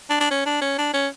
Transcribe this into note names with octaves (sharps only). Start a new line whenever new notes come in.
D4
D4
C#4
D4
C#4
D4
C#4